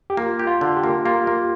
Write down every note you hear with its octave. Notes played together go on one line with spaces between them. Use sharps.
G4
A#3 F4
G4
F4
D3
G4
A#3
A#3 F4
A#3